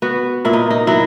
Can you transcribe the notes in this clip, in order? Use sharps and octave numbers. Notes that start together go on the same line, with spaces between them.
B3 F#4
A#2 E4
D#4
D#4
F#3 E4